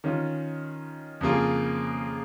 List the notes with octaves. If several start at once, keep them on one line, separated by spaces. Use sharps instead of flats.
D#3 C#4 F4
F2 C#3 A#3 F4 G#4